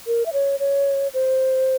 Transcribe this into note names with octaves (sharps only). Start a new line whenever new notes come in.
A#4
E5
C#5
C#5
C5